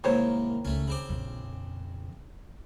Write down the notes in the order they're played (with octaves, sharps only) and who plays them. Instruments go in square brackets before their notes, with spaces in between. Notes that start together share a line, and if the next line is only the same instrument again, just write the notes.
[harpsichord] C2 G#2 A#3 [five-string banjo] D#3 C5 C#5
[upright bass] C#2 [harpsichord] A3 C#4
[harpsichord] C#3 C4 D6
[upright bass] A#1 F2